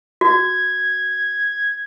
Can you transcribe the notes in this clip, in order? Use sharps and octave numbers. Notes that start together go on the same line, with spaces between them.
F#4 G#6